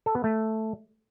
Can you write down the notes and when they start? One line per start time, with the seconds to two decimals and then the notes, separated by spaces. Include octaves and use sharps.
0.06 A4
0.15 B3
0.24 A3